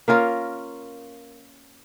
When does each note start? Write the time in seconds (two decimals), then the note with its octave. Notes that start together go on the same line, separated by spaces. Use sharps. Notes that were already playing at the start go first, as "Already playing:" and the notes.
0.08 A#3 C#4 F4 A#4